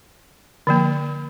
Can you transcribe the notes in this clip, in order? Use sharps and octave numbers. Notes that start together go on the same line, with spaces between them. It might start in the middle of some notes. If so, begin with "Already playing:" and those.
D3 F3 A#3